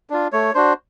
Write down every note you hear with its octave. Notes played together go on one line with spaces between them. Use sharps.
D4 F4
A3 C#5
D4 F#4 C5